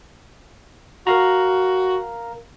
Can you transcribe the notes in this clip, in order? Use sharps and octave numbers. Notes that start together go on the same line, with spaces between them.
F#4 A#4 F5 A#5